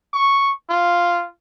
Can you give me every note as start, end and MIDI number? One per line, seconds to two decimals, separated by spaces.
0.14 0.50 85
0.70 1.26 65